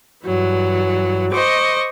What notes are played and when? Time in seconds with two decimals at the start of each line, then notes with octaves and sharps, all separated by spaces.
0.23 G2 E3 F#3
1.30 C5 D#5 C#6 D6